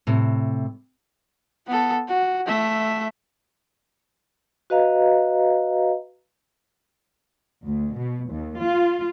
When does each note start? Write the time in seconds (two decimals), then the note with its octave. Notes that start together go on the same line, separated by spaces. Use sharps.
0.07 A2 C3
1.67 B3 A4
2.08 F#4
2.46 A3 E5
4.70 F#4 B4 D#5 F5 A#5
7.64 D2
7.96 B2
8.29 D#2
8.59 F4